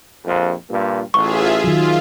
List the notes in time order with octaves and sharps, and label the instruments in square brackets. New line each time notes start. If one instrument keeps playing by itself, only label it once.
[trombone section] A#1 F2
G2 A#2
[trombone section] A1 [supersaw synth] F4 G#4 E5 [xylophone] C#6
[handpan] D#3 F#3 [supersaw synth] F4